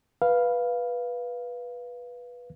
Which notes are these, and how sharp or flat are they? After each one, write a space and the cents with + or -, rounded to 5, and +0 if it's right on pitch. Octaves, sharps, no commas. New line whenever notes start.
B4 -10 F5 +0